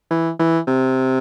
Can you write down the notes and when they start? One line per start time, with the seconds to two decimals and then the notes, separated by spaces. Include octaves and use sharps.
0.11 E3
0.39 E3
0.68 C3